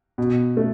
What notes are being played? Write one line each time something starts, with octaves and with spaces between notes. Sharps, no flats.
B2
A3